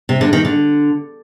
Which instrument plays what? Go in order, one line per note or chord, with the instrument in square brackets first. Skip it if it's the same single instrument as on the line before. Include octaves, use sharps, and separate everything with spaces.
[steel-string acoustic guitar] C3
D3
D#3
D3